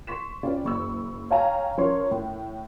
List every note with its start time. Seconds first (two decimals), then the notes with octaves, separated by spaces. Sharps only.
0.07 C6 C#6 B6 E7
0.43 C4 C#4 F4 B4 D5
0.65 F#1 C#6 E6
1.31 C#5 F5 G5 G#5 A#5
1.77 F3 C#4 A#4 C#5 C6
2.11 A2